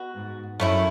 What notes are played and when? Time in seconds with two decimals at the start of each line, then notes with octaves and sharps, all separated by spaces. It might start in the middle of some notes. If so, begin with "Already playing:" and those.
Already playing: B2 B3 F#4
0.15 G#2
0.59 F#2 A3 C#4 E4